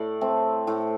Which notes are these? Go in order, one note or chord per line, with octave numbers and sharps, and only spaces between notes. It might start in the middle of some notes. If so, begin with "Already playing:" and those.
Already playing: A2 D5
A3 C4
A2